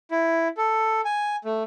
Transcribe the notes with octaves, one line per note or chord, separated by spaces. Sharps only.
E4
A4
G#5
A3